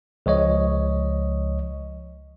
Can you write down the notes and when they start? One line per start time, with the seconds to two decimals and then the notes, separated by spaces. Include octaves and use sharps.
0.26 C#2 F3 C#5 D#5